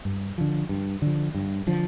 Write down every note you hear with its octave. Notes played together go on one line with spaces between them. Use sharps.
G2
D3 F3
G2
D3 F3
G2
D3 F3